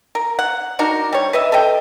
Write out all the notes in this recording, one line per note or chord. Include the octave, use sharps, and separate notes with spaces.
A#4
F#5
D4 D#4 F#4 A#4
G3 C#5
B4 D#5 E5
A4 B4 D#5 G5